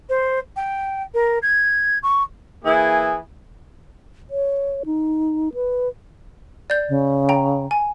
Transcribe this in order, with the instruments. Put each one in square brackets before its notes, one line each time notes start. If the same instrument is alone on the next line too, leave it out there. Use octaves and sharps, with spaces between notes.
[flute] C5
G5
A#4
G#6
C#6
[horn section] E3 A#3 E4 G#4
[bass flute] C#5
D#4
B4
[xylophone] D5 G6
[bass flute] C#3
[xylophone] G5 A#5
G#5